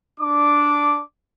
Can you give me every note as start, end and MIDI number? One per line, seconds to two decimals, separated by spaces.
0.20 1.02 62
0.20 1.02 86